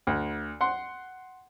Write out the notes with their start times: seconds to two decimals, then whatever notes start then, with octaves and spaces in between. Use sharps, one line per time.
0.07 D2
0.61 F#5 C6